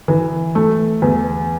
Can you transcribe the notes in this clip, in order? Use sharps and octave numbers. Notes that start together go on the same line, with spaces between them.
E3
A3
E2